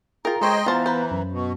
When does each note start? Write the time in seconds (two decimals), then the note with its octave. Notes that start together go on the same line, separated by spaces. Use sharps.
0.25 F4 G#4 A#4 G5 A#5
0.41 G#3 A4 C5 C#5 D#5 G5 C6
0.66 E3 F3 B3 C5 F5 A5 A6
0.86 B4 C5
1.11 F#2
1.32 B2 C#6